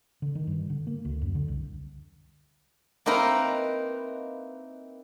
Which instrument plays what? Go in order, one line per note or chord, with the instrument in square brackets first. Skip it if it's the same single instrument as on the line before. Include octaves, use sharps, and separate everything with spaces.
[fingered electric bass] D3
D#3
G2
D3
A#3
D2
F#2
D3
C2
[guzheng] A#3 C4 D#4 E4 A#4 B4